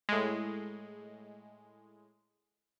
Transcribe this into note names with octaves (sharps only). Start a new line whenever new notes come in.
A2 G#3